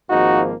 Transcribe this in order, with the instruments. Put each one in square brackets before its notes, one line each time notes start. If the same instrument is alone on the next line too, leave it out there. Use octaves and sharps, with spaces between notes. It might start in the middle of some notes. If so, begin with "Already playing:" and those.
[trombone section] G#1 G#2 F3 A#3 D#4 F#4